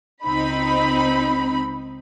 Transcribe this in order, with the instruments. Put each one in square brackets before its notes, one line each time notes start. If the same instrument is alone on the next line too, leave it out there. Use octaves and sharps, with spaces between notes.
[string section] C#2 C4 D#4 B5